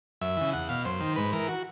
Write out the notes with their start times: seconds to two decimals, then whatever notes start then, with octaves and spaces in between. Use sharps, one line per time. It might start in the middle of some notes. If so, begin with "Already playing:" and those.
0.21 F#2 E5
0.37 C#3 E3
0.53 E2 F#5
0.69 B2 F5
0.85 F#2 C5
1.01 D#3
1.16 G#2 B4
1.33 E3 A#4
1.48 F#4